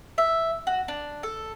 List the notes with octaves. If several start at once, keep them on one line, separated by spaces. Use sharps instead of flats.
E5
F#4
D4
A4